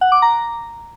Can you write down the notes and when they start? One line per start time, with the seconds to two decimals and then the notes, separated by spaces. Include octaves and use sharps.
0.01 F#5
0.12 D6
0.22 A#5